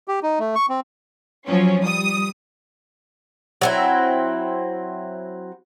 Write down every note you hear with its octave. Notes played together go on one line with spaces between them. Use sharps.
G4
D#4
A3
C#6
C4
F3 F#3 C#4
G3 D#6
F#3 C4 E4